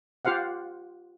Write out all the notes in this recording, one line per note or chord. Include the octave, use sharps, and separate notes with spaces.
F4 G4 C5 F5 F#5